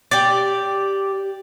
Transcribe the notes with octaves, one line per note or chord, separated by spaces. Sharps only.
G4 D5